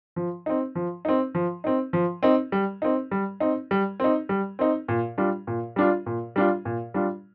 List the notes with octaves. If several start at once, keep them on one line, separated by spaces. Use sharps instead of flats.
F3
C4 D#4
F3
C4 D#4
F3
C4 D#4
F3
C4 D#4
G3
C4 D#4
G3
C4 D#4
G3
C4 D#4
G3
C4 D#4
A#2
G3 D4 F4
A#2
G3 D4 F4
A#2
G3 D4 F4
A#2
G3 D4 F4